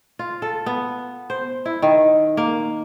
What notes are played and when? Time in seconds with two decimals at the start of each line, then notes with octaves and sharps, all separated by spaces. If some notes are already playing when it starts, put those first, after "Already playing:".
0.19 F4
0.42 A4
0.66 B3
1.30 C5
1.66 E4
1.82 D#3
2.37 A#3